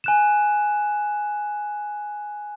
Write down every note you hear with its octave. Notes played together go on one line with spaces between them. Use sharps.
G#5 F#6 E7